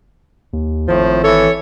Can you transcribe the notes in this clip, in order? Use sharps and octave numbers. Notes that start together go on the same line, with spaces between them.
D#2
G#1 A2 F3
E3 A4 C#5